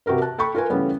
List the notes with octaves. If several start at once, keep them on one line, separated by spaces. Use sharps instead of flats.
C3 F#4 G4 A#4 B4
A5 F#6
A4 G5 B5 C#6
F4 A#4 B4 G#5
C#3 E3 G3 A3 B3 C#4